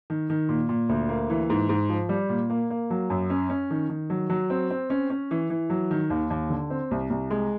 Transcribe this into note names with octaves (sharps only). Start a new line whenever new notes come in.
D#3
D#3
A#2
A#2
D2
A#3
E3
G#2
G#2
F3
G3
A#2
A#3
A#3
F#3
F#2
C#4
C#4
D#3
D#3
F#3
F#3
C4
C4
C#4
C#4
E3
E3
F#3
D#3
D#2
D#2
D3
C4
C2
C2
G#3